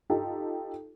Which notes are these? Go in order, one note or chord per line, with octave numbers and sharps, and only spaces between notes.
D#4 F4 G4 A4